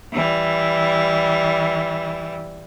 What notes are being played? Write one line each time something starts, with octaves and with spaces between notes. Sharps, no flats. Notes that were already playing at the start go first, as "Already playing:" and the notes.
E3 G3